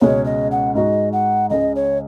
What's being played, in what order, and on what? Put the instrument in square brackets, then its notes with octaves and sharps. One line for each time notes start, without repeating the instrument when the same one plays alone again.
[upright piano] C#2 B2 G#3 C#4 [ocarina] C#5
[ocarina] D#5
F#5
[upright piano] G#2 G#3 D#4 F#4 [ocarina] D#5
[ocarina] F#5
[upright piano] C#2 C#3 G#3 [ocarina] D#5
[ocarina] C#5